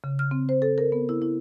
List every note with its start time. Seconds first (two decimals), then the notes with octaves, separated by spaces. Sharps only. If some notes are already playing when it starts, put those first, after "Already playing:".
0.04 C#3
0.19 F6
0.31 C4
0.49 C5
0.62 A4
0.78 A#4
0.92 B3
1.09 E4
1.22 E4